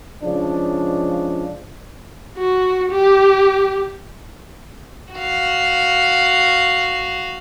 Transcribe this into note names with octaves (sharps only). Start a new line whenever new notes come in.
C#3 F3 G#3 D4
F#4
G4
F#4 F5